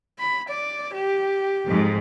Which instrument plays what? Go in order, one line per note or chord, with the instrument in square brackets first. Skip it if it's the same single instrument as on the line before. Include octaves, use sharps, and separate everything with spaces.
[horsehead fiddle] B5
D5
G4
[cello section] F2 G#2